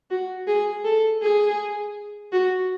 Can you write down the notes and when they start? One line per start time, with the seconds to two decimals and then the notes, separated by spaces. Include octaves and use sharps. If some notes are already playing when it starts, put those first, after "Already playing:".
0.10 F#4
0.47 G#4
0.85 A4
1.22 G#4
2.33 F#4